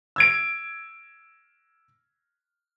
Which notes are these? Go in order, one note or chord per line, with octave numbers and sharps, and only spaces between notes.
E6 G#6 D7